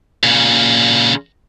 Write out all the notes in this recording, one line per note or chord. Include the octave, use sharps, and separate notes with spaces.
A#2 C#3